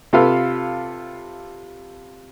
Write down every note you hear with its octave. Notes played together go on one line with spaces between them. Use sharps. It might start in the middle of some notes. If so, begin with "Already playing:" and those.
C3 F4 A4 B4 F5